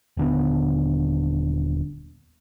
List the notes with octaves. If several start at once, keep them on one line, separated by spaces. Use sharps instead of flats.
D#1 D3 B3